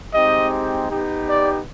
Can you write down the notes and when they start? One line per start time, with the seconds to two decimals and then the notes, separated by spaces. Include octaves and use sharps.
0.14 G#3 C4 D#4 G4 D#5
0.89 B3 D#4 G4
1.27 D5